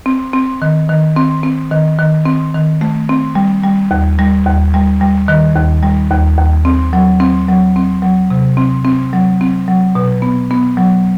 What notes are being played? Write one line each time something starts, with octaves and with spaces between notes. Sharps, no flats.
C4
C4
D#3
D#3
C4
C4
D#3
D#3
C4
D#3
A3
C4
G3
G3
D#2
G3
D#2
G3
G3
D#3
D#2
G3
D#2
D#2
C4
F#3
C4
F#3
C4
F#3
C3
C4
C4
F#3
C4
F#3
B2
B3
B3
F#3